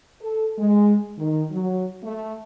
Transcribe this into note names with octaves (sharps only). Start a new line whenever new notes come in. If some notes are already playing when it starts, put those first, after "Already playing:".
A4
G#3
D#3
F#3
A3